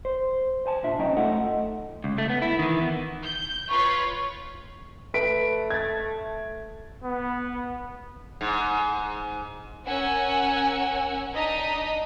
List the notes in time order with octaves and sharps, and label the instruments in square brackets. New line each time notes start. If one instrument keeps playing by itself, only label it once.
[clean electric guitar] C5
C5 G#5 A5
A#2 D4 F4 E5
F#3 C#4 D#4 D#5 G5 A#5
A3 D#4 F4 A4 D#5 F#5
[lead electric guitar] C#2
A3
B3
E4
D#3 E3
B3
[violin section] G6
[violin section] F4 B4 C#5 [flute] C#6
[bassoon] A3 [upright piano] B4 B6 D7
[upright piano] G#6 A6
[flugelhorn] B3
[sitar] G#2
[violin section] C#4 A#4 F#5 G#5 E6
D4 D#4 D#5 A#5 D#6 B6